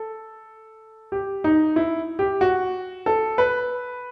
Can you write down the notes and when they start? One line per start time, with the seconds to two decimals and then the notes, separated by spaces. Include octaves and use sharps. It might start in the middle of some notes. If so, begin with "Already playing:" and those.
Already playing: A4
1.12 G4
1.44 D#4
1.76 E4
2.19 G4
2.41 F#4
3.06 A4
3.38 B4